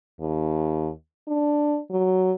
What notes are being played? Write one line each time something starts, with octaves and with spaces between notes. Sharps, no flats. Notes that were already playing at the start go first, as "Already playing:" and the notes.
D#2
D4
F#3